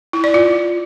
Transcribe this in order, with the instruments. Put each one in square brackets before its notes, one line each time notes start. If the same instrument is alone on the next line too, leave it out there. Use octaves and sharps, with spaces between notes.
[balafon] E4
D5
F4